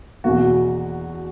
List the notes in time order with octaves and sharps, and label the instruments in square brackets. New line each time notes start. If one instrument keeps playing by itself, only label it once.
[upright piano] E2 B2 A#3 F#4